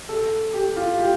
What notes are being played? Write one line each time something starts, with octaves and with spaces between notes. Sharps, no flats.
A4
G4
F4
G4